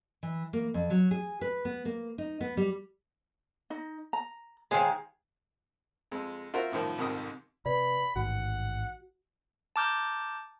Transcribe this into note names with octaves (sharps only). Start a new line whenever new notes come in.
E3
A#3
F2
F#3
G#4
B4
B3
A#3
D#4
B3
G3
D#4 D#5
A#5
D#3 G#3 C5 F5 G#5
F2 G#3
F4 F#4 A#4 C5 E5
F#2 A2 D#3 F3
C2 F2 G#2 D#3 D#6
C3 B4 D5 B5
A1 G#2 D#3 F#4 F#5
A5 A#5 D6 F6 G6